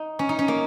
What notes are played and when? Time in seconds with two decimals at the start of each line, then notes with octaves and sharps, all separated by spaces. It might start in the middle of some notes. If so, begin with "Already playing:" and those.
Already playing: D#4
0.19 C#4
0.29 D#4
0.39 C#4
0.48 A#3